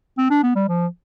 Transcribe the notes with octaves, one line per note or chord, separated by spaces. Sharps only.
C4
D4
B3
G3
F3